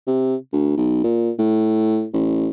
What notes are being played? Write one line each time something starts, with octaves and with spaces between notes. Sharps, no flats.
C3
D2
B1
A#2
A2
A1